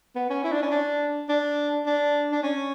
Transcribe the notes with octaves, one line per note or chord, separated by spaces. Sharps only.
B3
C#4
E4
D4
C#4
D4
D4
D4
D4
C#4